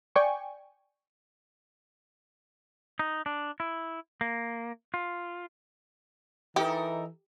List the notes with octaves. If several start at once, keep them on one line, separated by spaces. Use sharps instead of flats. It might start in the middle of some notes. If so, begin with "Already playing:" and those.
D5 G5 G#5 C#6
D#4
D4
E4
A#3
F4
E3 D#4 G4 A4 A#4